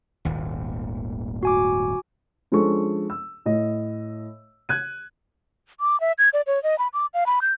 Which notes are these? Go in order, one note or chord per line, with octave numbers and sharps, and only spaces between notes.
D#1 G#1 D#2
F#4 G#5 D6
F3 G#3 C#4 D4 A4 C#6
E6
A2 D#5
F#6 G#6 D#7
D6
E5
G#6
D5
C#5
D#5
B5
D6
F5
B5
G6